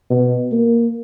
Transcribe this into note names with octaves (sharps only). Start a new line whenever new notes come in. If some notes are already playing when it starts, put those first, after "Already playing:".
B2
A#3